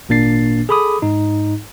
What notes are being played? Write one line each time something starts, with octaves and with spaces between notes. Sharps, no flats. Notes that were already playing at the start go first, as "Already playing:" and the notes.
G#1 A#2 A#3 D4 A6 C7
G#4 A4 B5 D6 D#6
G#2 D#4